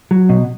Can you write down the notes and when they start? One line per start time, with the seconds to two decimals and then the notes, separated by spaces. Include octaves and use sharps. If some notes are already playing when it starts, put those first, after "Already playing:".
0.11 F#3
0.29 B2